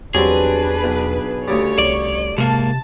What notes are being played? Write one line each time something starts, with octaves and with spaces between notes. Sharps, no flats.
E2 F#3 G3 C4 D4 G#4 B4
B1
D2 C#3 G3 C#5
C2 D5
G#2 C3 A#3 A5